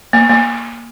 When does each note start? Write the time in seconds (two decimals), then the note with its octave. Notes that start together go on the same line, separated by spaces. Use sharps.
0.13 A#3
0.29 A#3